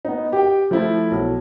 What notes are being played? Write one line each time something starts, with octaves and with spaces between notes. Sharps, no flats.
B3 D#4
G4 G5
F3 A3 E4
B1